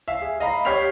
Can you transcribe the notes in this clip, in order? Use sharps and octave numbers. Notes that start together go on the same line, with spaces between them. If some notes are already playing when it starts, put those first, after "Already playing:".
E5 F5
G#4
D#5 F5 A#5 B5
G4 C#5 F6 B6 C7 F7